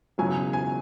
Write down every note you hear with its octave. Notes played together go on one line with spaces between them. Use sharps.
E1 E2 C#3 F#3 G#5
G#5